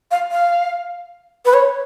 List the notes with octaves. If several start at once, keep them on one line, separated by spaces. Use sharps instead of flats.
F5
F5
B4
C#5